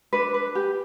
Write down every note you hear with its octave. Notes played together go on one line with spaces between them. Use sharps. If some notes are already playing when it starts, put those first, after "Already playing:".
D4 B4
B4
G4